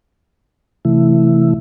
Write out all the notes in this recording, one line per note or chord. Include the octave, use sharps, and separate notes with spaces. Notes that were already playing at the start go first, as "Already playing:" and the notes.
C3 E3 A3 E4